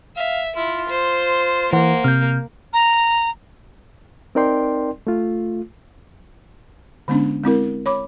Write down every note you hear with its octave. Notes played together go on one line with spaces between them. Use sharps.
E5 F5
E4 F4
C5
E3 A#3 C5 F#5 C6
C3 F6 G6
A#5
C4 D#4 A#4 D5 G5 C6
A3 F4
D3 G#3 B3 C#4 D4
G#3 C4 E4 A#4
C#5 B5 D6